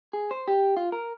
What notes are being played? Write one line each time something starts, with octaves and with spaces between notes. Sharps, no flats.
G#4
C5
G4
F4
A#4